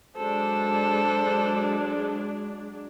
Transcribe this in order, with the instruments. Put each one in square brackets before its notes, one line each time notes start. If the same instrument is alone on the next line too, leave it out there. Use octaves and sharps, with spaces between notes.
[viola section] F#3 G#3 D4 [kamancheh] A4 C5